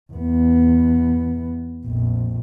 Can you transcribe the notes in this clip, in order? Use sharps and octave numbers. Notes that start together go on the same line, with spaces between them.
E2 B3
A#1 F2